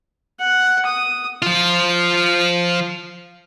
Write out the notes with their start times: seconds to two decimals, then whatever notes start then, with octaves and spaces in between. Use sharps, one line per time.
0.40 F#5
0.86 D#6
1.42 F3 F4